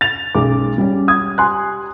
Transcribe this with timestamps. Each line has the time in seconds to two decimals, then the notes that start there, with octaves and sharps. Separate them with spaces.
0.01 A6 F7
0.34 B1 F#2 G#3 D6
0.78 G3 C#4
1.08 D#6 G#6
1.38 G#5 C6 F#6